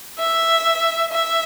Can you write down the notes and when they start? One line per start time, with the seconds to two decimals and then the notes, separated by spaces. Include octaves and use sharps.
0.19 E5
1.13 E5